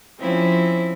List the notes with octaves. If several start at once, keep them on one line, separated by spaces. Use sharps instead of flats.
F3 C4 C#4 E4